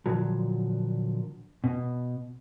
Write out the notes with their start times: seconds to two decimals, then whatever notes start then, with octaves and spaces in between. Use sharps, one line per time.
0.06 A#2 D3 F3 F#3
1.64 B2